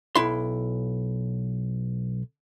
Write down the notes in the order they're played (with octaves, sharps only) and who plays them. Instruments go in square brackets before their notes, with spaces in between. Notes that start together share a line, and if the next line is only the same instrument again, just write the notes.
[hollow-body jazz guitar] B1 E4 C6